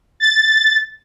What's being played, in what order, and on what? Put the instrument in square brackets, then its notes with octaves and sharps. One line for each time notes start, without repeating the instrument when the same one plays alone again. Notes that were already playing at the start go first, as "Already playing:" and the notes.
[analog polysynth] A6